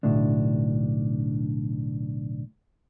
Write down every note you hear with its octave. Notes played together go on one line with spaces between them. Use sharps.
B1 A2 D3 D4